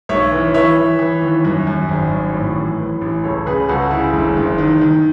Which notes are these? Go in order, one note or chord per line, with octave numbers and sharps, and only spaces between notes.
B1 C#5 E5
E3
E3 C#5 E5
E3
E3
D#2
F#2
F#2
G#1
F#2
A2
A1
E3
A1
C#2 A4 C#5
C#3 G#4 B4
C#2 F#4 A4
C#3 E4 G#4
F#1
F#1
D#3
D#3